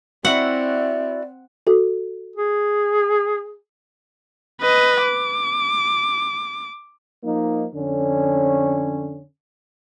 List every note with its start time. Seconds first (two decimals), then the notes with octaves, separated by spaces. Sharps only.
0.25 C4 E4 F#4 D5 F#5
1.67 F#4 A4
2.36 G#4
4.61 B4 D#5
5.03 D6
7.24 F3 A#3 D#4
7.75 F2 D3 C#4